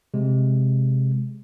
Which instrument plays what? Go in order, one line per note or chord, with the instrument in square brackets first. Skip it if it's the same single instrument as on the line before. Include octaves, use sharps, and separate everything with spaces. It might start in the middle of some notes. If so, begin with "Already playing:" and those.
[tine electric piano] C3 G#3